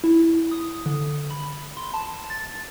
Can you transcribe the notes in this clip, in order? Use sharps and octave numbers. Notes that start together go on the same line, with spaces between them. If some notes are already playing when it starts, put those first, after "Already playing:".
E4
D#6
D3
B5
C6
A5
A6